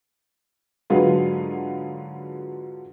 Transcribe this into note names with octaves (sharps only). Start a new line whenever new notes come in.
G#2 D3 F#3 F4 G#4 B4